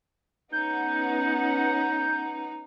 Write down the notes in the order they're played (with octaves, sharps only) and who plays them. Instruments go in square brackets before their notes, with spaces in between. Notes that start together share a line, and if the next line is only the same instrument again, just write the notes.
[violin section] B3 C#4 F#5 [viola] D#4 [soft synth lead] G6